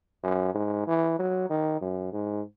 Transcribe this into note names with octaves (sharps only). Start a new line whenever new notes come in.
F#2
G#2
E3
F#3
D#3
F#2
G#2